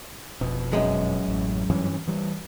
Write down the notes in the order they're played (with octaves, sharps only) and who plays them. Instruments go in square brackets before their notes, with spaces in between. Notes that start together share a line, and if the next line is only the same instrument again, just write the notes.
[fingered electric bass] F1 B2
[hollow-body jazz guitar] F#2 G#3
[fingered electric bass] A1
G2 E3 C#4
E3 G3